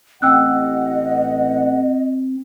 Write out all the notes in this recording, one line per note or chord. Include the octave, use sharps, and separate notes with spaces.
A1 C4 D#5 F#5 G5 E6 F#6